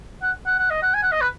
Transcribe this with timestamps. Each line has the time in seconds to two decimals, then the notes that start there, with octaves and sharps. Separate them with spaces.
0.23 F#5
0.46 F#5
0.59 F#5
0.70 D#5
0.83 F#5
0.94 G#5
1.03 F#5
1.12 D#5
1.21 B4